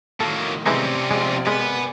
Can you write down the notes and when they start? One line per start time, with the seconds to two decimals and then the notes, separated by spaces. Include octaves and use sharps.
0.20 A2 D#3 F#3 A#3 A4
0.66 C3 E3 G#3 C4 C#4 D#4 D5
1.11 F2 G#3 F4
1.47 G#3 B3 A#4 B4 G#5